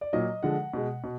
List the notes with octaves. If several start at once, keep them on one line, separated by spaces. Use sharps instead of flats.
D5
A#2 F#3 D#5
D3 F3 G#3 F#5
B2 G#3
B2